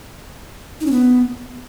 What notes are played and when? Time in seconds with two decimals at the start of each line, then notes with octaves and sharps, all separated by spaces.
0.81 D#4
0.86 C#4
0.91 B3